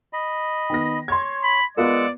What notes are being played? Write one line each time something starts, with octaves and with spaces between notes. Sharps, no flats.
D#5 B5
D#3 B3 A#6
C#5 C6 G#6
B5
G#3 B3 F4 A#4 D5 F#5 E6